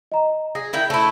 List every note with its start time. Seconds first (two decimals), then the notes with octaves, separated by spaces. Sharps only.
0.12 D#5 A#5
0.55 G#4 A#6
0.73 D#3 E4 G5
0.90 A3 E4